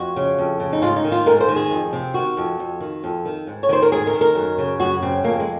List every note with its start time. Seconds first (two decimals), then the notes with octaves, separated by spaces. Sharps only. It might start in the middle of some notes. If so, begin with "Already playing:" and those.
Already playing: F2 F#4
0.16 C#3
0.38 F2
0.60 C#3
0.73 D#4
0.82 G#2 F4
0.96 D#4
1.04 D#3
1.12 F4
1.26 G#2 A#4
1.40 C5
1.48 D#3
1.56 G#4
1.71 F2
1.93 C3
2.14 D#3 F#4
2.37 F2
2.59 F2
2.80 D#3
3.04 F2
3.25 D#3
3.47 G#2
3.63 C#5
3.69 D#3 C5
3.82 A#4
3.92 G#2 G#4
4.07 A#4
4.13 D#3
4.21 A#4
4.35 F#2
4.58 C#3
4.79 F#2 F#4
5.02 C#3 C4
5.24 F2 A#3
5.39 G#3